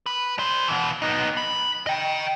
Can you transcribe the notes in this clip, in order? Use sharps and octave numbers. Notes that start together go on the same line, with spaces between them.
B4
G3 C5
B2 E3
B3 D#4
B5
D#5 G5